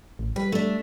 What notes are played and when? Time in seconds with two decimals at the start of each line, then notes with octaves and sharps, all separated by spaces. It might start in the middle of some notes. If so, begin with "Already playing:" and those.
0.19 A1
0.36 G3 B4
0.52 A3 D4